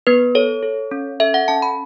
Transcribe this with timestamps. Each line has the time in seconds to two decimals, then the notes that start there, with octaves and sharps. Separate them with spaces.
0.07 B3 B4
0.35 A4 C#5
0.63 A4
0.91 C#4
1.20 A4 E5
1.34 F#5
1.48 C#4 A5
1.62 B5